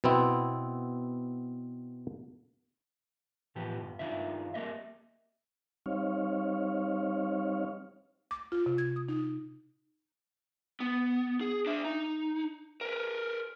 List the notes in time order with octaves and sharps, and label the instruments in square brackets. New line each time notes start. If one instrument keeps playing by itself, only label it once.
[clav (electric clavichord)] B2 B3 C4 E4
[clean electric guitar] A2 E3 F3 B3 G4
D2 G2
G2 B2 D#3 D4 F4 E5
G3 A3 A#3 D#5 E5
[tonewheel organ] G3 C4 D#4 C#5 F5
[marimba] D6
F4
C3
G#6
D#6
D#4
[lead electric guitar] B3
G#4
D4 E5
D#4
A#4 B4